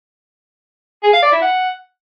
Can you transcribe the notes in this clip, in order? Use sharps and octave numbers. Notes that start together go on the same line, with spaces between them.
G#4
F5
D5
E4
F#5